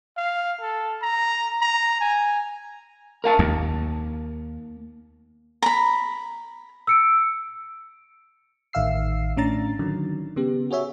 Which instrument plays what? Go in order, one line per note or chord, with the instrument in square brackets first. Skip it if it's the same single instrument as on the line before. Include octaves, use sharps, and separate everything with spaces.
[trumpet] F5
A4
A#5
A#5
G#5
[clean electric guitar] A#4 F5 A5
[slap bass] D#2 [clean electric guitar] A#3
[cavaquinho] A#5 B5
[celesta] E6 C#7 D7
[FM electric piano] A1 D#3 E5 F5 E6 C7
A2 C#4 D4 A#5 A6
D3 D#3 F#3
C#3 B3 G4
F#4 G#4 C#5 E5